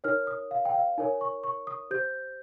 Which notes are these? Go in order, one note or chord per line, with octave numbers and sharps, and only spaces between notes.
D#4 A#4 C#5 F6
D#6
F5
G5
F5
D#4 A#4 C#5 G#5
C#6
C#6
D#6
G4 C5 G6